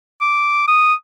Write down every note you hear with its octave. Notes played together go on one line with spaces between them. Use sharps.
D6
D#6